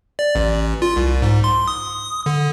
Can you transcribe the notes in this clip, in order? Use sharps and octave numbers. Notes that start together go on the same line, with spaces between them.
D5
A1
F4
C2
G#2
C6
D#6
D3